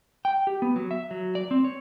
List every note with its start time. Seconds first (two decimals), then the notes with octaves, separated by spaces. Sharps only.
0.25 G5
0.47 G4
0.62 B3
0.76 F#3
0.91 E5
1.11 F#3
1.35 D5
1.51 C4
1.64 C#5